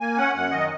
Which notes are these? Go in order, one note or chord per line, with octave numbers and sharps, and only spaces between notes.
A#3 G#5
C#4 F#5
F#2 F#5
D#3 D#5